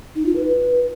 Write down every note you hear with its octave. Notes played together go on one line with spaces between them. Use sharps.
D#4
F4
B4